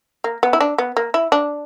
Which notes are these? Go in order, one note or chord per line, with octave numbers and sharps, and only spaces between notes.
A#3
B3
E4
D4
B3
A#3
E4
D4